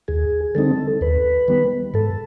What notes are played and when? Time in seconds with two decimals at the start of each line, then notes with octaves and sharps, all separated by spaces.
0.08 D#2 G#4
0.55 D3 G3 C4 D#4 A4
1.01 D#2 B4
1.48 D#3 G3 B3
1.94 G#2 A4